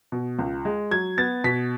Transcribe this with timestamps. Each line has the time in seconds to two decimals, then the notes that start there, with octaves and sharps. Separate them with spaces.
0.12 B2
0.39 C#2
0.65 G#3
0.91 F#3 G#6
1.18 B3 A6
1.44 B2 B6